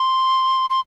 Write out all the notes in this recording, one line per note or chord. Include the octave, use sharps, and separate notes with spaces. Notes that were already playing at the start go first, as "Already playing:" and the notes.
Already playing: C6
C6